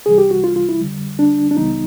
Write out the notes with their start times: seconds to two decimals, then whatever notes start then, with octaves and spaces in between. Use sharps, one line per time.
0.06 C2 C3 E3 G3 G#4
0.18 G4
0.31 F#4
0.44 F4
0.56 F4
0.69 E4
0.81 F2 D3 G3
1.19 D4
1.51 D4
1.57 C#2 C#3 E3 G3 B3 D#4